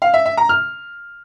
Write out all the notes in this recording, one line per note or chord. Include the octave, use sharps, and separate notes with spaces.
F5
E5
E5
A#5
F6